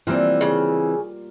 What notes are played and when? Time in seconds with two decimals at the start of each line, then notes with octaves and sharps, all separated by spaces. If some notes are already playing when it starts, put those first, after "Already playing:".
0.07 E3 G3 A#3 C4 F4
0.41 C#3